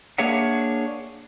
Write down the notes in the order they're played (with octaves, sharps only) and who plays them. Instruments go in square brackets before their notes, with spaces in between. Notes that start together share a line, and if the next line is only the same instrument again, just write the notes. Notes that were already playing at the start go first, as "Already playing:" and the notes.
[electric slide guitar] A#3 D4 G#4 C#5 E5 F#5